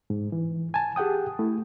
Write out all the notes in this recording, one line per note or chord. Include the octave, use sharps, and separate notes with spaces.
G#2
E3
G#5 A5
G4 G#4 F#5 G5 D#6
A3 E4